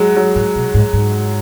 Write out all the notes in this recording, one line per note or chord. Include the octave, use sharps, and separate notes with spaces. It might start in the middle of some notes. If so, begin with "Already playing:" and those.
Already playing: F#3 G#3
F#3
G#2
B2
G#2
G#2